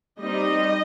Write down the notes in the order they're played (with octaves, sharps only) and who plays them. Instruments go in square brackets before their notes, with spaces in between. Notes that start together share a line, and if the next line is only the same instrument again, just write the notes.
[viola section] G3 C4 D#4 D#5